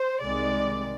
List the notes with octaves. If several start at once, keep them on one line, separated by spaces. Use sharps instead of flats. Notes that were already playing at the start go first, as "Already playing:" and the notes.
Already playing: C5
C2 C3 D#3 G#3 D5